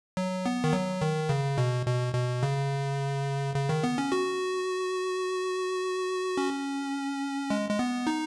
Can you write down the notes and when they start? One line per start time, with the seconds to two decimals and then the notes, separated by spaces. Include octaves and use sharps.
0.17 F#3
0.46 B3
0.64 D#3
0.73 F#3
1.01 D#3
1.29 C#3
1.58 B2
1.86 B2
2.14 B2
2.43 C#3
3.55 C#3
3.69 D#3
3.84 B3
3.98 C#4
4.12 F#4
6.37 C#4
7.50 G#3
7.70 G#3
7.79 B3
8.07 D#4